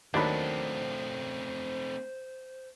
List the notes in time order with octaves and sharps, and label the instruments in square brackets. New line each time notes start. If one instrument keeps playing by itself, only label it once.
[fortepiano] D#2 D#3 B5 [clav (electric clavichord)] F#3 D4 [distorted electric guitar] A3 C4 [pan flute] C5